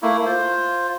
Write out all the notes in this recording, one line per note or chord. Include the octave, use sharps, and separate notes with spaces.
A3 A#3 E4
F4 C5